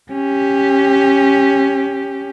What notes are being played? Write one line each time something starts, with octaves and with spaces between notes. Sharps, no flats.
C#4 G4